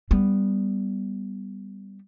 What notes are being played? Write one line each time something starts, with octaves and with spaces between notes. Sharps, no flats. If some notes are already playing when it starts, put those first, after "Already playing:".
G3 B3